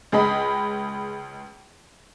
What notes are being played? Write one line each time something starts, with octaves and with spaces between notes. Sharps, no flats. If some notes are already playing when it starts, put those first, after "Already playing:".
C#2 G#4 D#5 B5